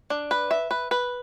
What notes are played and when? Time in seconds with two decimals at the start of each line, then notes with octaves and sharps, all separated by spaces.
0.10 D4
0.31 B4
0.51 E5
0.71 B4
0.91 B4